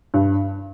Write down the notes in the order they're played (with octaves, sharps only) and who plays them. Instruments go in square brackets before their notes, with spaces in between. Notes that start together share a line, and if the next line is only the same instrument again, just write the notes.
[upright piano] G2